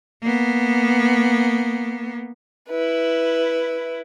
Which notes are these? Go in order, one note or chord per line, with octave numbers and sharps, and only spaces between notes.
A#3 B3
E4 B4